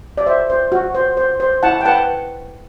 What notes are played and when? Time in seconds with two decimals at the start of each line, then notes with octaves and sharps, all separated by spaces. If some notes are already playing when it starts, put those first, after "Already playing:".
0.18 D5
0.26 C5 E5
0.50 C5
0.72 F#4
0.95 C5
1.17 C5
1.40 C5
1.63 E4 F#5 A5
1.81 G5
1.85 B4 F#5 A5